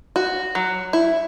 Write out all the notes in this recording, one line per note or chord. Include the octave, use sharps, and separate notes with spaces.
F#4
F#3
E4